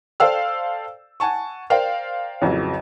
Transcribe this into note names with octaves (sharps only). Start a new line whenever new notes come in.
A4 C5 D5 F5 G5 E6
F#5 G#5 A5 C#6
A#4 C5 D5 F5 G5
A1 F2 C#3 E3 F#3